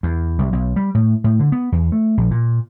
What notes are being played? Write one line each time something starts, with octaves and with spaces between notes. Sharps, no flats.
E2
C2
B1
G3
A2
A2
D3
B3
E2
A3
A#1
A#2